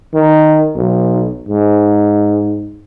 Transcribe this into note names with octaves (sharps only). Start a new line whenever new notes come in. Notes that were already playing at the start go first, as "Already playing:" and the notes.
D#3
B1
G#2